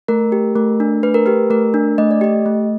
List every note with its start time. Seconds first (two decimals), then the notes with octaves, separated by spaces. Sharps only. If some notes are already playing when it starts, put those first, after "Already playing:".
0.08 A3 A#4
0.32 G4
0.56 A3 A#4
0.80 D4
1.03 A3 B4
1.14 A#4
1.26 G4 B4
1.50 A3 A#4
1.74 D4
1.98 A3 D#5
2.11 D5
2.21 G4 D#5
2.46 A3